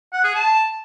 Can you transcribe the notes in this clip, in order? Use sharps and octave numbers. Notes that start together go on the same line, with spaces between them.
F#5
G#4
A5